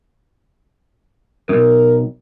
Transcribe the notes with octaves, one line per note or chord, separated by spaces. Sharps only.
B1 F#2 A#4